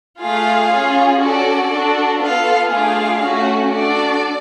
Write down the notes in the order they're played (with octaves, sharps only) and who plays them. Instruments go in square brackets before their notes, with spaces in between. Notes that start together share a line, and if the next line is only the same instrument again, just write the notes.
[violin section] A3 F4 G#4 F5
C#4 F4 G#4
C#4 F#4 A4 D5
D4 F#4 A4
B3 F4 A4 F5
A3 D4 F4 G#4 F5
A3 C#4 F#4
D4 F#4 A4 D5